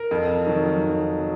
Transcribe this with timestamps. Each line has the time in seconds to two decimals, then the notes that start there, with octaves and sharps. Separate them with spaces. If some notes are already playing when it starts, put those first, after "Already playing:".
Already playing: A#4
0.11 F2
0.47 D#3 F#3
0.83 F2
1.18 F#3